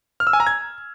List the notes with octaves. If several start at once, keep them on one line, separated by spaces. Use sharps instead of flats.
F6
E6
G#5
A#5
G#6